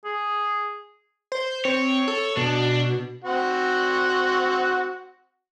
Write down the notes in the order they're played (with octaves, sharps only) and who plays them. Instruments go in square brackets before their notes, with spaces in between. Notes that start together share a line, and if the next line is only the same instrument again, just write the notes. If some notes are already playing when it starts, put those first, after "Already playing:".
[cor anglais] G#4
[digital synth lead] C5
[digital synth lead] C4 [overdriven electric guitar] C#5
[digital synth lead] A4
[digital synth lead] B2 [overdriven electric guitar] D4
[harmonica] C4 F#4 F#5